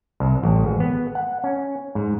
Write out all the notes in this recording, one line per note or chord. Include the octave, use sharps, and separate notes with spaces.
C2
A1
G#1
B3
F#5
C#4
G#2